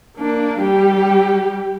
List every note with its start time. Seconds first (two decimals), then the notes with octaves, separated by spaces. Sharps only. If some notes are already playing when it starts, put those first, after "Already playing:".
0.17 A#3 D4
0.60 G3 G4